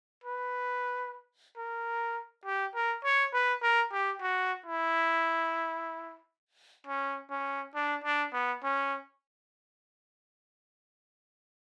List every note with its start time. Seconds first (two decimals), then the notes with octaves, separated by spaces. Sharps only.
0.24 B4
1.57 A#4
2.45 G4
2.75 A#4
3.04 C#5
3.33 B4
3.63 A#4
3.92 G4
4.22 F#4
4.66 E4
6.87 C#4
7.30 C#4
7.75 D4
8.04 D4
8.33 B3
8.64 C#4